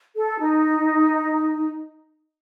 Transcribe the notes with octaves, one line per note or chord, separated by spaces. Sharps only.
A4
D#4